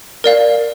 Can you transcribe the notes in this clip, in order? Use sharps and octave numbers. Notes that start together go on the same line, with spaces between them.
A#4 D5 F5